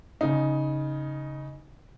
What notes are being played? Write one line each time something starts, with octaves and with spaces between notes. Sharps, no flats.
C#3 D#4